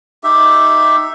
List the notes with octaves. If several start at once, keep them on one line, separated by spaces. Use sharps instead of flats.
D#4 G4 E5